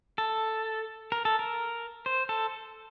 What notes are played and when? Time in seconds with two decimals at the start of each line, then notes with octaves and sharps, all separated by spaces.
0.18 A4
1.12 A#4
1.25 A4
1.39 A#4
2.06 C5
2.29 A4